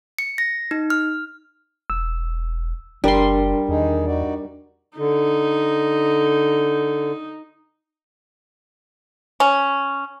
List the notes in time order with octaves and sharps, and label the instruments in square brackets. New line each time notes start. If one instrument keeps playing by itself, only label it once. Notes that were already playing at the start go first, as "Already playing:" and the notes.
[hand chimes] C#7
A#6
D#4
F6
[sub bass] E1 [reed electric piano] E6
[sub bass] F#1 [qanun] G3 C6 [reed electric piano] D4 A#4
[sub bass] E2 [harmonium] D#3 D#4 G#4
[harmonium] D#4 F#4 D5
[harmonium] D3 [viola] D#4
[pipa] C#4